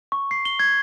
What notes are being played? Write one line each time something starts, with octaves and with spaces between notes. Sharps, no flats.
C#6
C7
G7
G#6